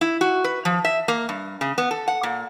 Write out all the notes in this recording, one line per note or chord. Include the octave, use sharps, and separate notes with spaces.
E4
F#4
B4
F3
E5
A#3
G2
C#3
B3
A4
F#5
A#2